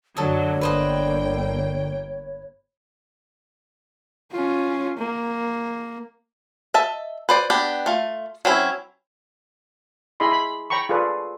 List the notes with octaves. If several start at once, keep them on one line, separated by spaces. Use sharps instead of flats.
F#2 D3 F#3 A4 C#5 D#5
G1 A#3 B4 C5 D#5 G5
C#4 F4
A#3
D#5 E5 A5
B4 C5 D5
B3 D4 G4
A3 F4
F#3 C4 C#4 E4
E4 G#4 D#5 B5 C6
B5
C#5 G5 A#5 B5 C#6
F4 G#4 A4 B4 D5